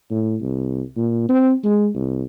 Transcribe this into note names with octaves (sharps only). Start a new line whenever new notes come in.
A2
C2
A#2
C4
G#3
C2